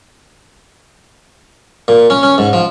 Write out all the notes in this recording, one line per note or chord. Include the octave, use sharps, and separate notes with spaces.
A#2
C#4
C#4
G#2
F3